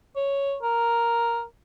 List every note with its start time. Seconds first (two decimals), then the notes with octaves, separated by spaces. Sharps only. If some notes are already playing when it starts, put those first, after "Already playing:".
0.16 C#5
0.62 A#4